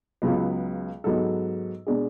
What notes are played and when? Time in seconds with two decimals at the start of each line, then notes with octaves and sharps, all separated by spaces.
0.22 C#2 C#3 F#3 B3
1.04 G#2 F#3 B3 F#4 A4
1.87 B2 G#3 D4 G#4